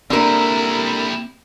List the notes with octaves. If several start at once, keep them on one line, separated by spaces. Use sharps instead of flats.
D3 G3 A#3 C4 E4 A#4